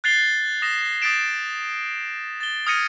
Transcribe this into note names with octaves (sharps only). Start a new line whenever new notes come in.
F#6 G#6 A6 C7 F7 G7
D#6 A#6 E7
D#6 G6 A6 B6 D7 E7
A6 G7
D#6 F6 G#6 A#6 C#7 D#7